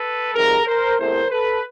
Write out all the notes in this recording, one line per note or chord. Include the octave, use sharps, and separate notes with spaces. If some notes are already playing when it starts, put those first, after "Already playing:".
Already playing: A4 B4
F2 C3 D#3 G3 G#4 A#4
A#4 C5
E2 C3 E3 A3 A#4 C5
A4 B4